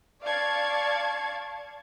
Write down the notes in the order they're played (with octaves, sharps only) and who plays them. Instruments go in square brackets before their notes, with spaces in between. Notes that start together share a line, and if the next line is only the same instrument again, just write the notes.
[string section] D5 F5 A5 C#6 G#6